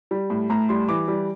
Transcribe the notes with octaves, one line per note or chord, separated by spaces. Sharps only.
G3
A2
A2 A#5
G3 C6
E3 D6
G3